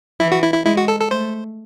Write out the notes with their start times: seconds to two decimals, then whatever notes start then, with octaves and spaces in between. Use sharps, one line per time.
0.20 E3 E4
0.32 F#4
0.43 E4
0.54 E4
0.65 G#3 E4
0.77 F#4
0.88 A4
1.00 A4
1.11 A3 C5